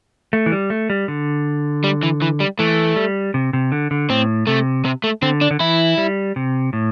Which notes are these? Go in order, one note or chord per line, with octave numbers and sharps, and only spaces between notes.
A3
E3
G3
A3
G3
D3
G3
E3
E3
G3
E3 A3
G3
C3
C3
D3
D3
A2 C4
C3 A3
C3
A3
D3 C4
D4
D3
E3 E4
G3
C3
A2